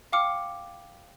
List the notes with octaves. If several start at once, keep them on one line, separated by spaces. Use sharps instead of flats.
F5 G5 D6 F6 C#7